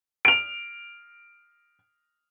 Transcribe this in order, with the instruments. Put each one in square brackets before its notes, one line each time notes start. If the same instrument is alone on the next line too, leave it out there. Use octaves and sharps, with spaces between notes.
[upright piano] D7 F7